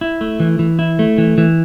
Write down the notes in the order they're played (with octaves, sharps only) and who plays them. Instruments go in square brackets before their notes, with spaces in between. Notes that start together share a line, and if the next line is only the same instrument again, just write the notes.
[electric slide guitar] E4
A3
E3
E3
E4
A3
E3
E3